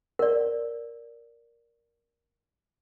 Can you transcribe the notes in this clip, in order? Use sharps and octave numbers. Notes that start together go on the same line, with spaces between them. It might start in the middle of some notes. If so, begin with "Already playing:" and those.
A#4 D5